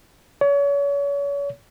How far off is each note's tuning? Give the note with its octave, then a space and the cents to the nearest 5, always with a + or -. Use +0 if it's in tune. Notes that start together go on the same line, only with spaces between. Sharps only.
C#5 +35